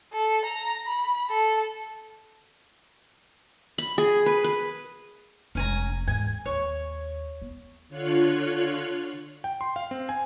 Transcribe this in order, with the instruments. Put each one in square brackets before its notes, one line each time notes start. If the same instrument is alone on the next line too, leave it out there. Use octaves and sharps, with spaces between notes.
[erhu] A4
A#5
B5
A4
[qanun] B5
G#4
B4
B4
[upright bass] F1 G#3 [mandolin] C#4 G#5 A#5
[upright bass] E2 G#2 [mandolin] G#5
[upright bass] D#2 [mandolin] C#5
[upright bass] B3
[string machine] D3 F4 C#5 F#6
[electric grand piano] G5
C6
F5
C4
G#5